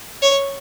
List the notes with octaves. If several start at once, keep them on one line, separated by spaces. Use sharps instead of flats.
C#5